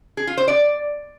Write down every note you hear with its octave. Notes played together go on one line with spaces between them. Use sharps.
G#4
F4
C5
D5